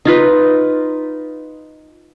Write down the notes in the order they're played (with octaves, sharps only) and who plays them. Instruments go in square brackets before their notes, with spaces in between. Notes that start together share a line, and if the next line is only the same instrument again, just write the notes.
[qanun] D#4 F4 B4